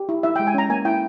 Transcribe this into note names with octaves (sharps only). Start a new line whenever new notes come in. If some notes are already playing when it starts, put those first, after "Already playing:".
Already playing: G4
E4
E4 E5
G#3 G5
G#5
C#4 A#5
A#3 G#5
E4 G5